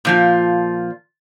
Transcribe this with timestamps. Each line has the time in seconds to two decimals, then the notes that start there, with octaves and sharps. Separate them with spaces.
0.05 A#2 F3 F4